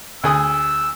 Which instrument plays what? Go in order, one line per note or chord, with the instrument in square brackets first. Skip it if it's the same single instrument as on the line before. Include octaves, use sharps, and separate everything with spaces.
[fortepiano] D2 G#4 D#6 [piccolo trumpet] E6